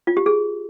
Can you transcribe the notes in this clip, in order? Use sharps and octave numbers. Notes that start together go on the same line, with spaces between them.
F4
G4
G#4